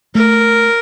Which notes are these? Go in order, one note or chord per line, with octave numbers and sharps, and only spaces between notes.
A3 A#4